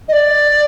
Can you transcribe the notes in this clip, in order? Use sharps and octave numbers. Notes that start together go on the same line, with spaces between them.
D#5
D5